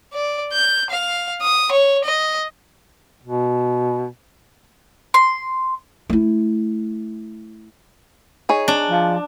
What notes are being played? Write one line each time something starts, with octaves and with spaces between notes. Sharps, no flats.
D5
G6
F5
D#6
C#5
D#5
B2
C6
A3 E4
D#4 G#4 C#5
D4
F3